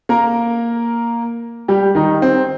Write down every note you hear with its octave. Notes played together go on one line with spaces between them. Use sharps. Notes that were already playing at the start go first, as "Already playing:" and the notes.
A#3 A#4
G3 G4
D#3 D#4
C4